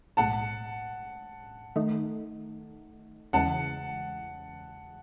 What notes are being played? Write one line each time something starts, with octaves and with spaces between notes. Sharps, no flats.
B1 A2 G#3 F#5 A5
D#3 A3 D#4
E2 C#3 E3 G#3 F#5 A5